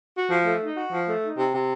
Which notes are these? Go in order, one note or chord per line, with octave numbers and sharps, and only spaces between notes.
F#4
F3
A3
D#4
F#4
F3
A3
D#4
C3
C3